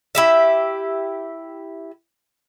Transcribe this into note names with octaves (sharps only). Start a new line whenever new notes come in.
E4 G4 E5